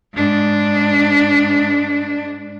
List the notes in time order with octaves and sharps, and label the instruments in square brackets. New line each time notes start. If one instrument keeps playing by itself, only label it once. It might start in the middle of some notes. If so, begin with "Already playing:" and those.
[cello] G#2 D4